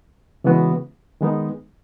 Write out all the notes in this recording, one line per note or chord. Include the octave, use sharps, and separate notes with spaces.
C#3 E3 G#3 B3 F#4
D#3 G#3 B3 D#4